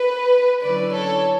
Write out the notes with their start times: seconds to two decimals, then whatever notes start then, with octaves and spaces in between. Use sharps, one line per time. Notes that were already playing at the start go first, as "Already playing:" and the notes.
Already playing: B4
0.62 D3 F#3 C#4 E4 B4 D5
0.94 A4 C#5